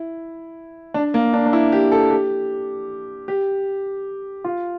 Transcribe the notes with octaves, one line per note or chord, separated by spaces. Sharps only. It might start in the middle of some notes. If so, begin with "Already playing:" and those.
Already playing: E4
D4
A#3
D4
D4
E4
G4
A4
G4
G4
F4